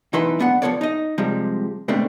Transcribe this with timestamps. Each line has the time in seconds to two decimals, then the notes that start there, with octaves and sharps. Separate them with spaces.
0.13 B1 E3 D#4 E4 B4 C6
0.40 B1 B3 D4 F#5
0.62 F3 A#3 B3 A4 C#5 D5
0.81 D#4 D#5
1.18 C3 F3 G3 G#3
1.88 G#2 B2 D3 A3 C4 D4